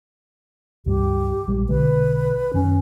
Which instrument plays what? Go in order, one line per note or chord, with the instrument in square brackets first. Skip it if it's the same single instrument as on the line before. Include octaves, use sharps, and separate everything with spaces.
[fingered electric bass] C#2 G2 G3 [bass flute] G4
[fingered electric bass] A#1 G3 G#3
[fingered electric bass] B1 D3 G#3 [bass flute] B4
[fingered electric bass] F#2 D#3 [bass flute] C#4